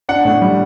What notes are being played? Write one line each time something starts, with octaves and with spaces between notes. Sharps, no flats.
D4 F#5
A2
G3